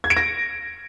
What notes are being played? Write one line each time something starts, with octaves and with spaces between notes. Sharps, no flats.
G#6
D7
A#6